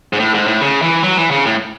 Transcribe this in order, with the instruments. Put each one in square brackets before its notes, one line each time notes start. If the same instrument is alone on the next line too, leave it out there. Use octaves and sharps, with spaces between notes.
[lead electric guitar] G#2
A2
G#2
A2
C#3
E3
F#3
E3
C#3
A2